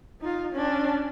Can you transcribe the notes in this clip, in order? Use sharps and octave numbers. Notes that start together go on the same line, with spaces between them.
D#4 F4
C#4 D4